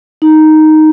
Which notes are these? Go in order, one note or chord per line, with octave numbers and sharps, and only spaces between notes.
D#4